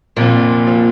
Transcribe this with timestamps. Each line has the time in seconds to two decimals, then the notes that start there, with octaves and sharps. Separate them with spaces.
0.17 F1 F2 A#2 F3
0.67 F3